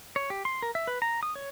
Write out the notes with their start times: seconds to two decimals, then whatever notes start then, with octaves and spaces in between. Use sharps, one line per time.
0.16 C#5
0.30 G4
0.45 C6
0.62 A#4
0.75 E5
0.87 B4
1.02 A#5
1.23 D#6
1.35 C#5